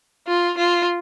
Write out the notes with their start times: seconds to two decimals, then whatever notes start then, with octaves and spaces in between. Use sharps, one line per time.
0.28 F4
0.58 F4